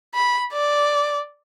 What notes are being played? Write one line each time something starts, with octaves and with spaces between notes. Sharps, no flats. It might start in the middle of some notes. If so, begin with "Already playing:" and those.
B5
D5